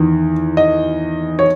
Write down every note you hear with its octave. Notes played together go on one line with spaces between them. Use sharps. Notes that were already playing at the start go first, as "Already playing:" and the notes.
Already playing: E2 D#3
D#5
C#5